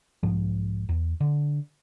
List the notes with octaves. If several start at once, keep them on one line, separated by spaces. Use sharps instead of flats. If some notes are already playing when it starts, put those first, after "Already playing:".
B1 G#2 F3
E2
D3